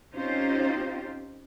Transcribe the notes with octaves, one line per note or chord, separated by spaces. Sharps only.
C4 C#4 D#4 F4 G4 C5